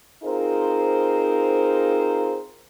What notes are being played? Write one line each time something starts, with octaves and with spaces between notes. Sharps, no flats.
C4 D#4 F4 G#4 A#4 C5